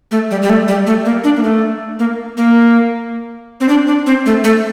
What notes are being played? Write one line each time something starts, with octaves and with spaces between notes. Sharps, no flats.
A3
G3
G3
A3
G3
A3
A#3
D4
A#3
A3
A#3
A#3
C4
D4
D4
C4
A3
A3